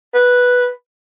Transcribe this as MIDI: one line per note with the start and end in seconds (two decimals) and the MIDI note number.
0.15 0.70 71